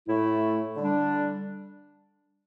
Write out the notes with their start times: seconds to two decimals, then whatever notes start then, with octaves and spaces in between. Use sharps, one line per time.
0.08 A2 A3 E4
0.76 D3 G3 D4